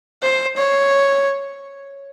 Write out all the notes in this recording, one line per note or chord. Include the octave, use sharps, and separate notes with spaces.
C5
C#5